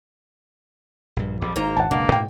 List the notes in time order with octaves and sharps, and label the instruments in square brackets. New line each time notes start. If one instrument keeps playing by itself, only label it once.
[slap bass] A#1 G2
[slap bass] A#1 F2 F3 [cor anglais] G3
[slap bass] G#1 [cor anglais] A#3 [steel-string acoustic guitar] D#4 C5 A#5
[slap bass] G#1 [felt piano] F#5 A5
[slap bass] F#1 C#2 D4 [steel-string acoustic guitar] B2 [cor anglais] A#3
[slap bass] G#2 [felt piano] G5